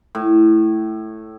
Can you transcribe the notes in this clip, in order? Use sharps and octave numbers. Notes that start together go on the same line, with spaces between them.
A2